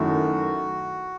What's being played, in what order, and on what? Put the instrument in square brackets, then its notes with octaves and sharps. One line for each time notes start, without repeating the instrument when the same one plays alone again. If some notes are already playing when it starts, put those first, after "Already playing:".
Already playing: [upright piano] F#2 D#3 A3 E4 [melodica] F#4